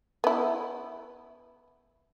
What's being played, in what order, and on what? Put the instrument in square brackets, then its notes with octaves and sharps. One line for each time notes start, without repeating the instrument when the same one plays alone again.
[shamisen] B3 E4